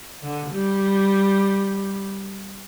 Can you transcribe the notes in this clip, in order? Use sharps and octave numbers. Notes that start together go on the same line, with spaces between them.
D3
G3